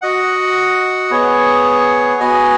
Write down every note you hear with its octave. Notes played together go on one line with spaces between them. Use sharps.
F#4 D#5 F#5
B3 G#4 C#5
B3 F#4 D#5 G#5